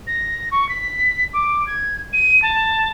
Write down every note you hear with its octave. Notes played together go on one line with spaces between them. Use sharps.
A#6
C#6
B6
D6
G#6
D#7
A5